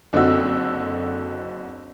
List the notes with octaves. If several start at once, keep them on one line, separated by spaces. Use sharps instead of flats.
F#1 D3 C4 D#4 F#4 E6